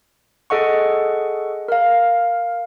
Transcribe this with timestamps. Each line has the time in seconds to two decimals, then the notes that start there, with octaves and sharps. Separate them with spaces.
0.50 G#4 A4 D#5 F#5 C#6
1.68 A#4 F5